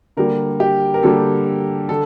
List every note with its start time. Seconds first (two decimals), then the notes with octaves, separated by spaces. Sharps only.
0.17 D3 G3 A#3 A#4
0.60 G4
0.94 A#4
1.03 D3 G3 A#3 A4
1.89 D3 A4